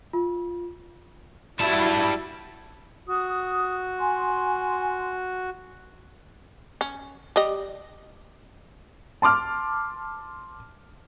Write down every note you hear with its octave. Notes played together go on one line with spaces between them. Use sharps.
F4
G3 E4 F#4 A5
F#4 D#6
G#5 C6
C#4
G3 G4 D#5
A5 C6 D6 F6